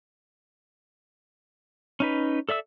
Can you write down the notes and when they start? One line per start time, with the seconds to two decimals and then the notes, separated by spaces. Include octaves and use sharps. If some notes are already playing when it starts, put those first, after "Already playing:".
2.00 C#4 D#4 B4
2.49 A4 D5 E5 E6